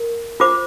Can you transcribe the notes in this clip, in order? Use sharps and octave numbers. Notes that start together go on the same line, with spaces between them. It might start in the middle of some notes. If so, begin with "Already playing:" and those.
Already playing: A#4
F4 C5 D6